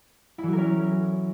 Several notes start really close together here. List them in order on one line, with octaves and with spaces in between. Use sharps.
E4 E3 F#3 A#4 C#4